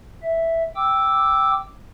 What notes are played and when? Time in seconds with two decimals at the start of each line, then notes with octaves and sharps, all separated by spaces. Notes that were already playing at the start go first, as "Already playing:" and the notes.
0.22 E5
0.76 G5 D6 E6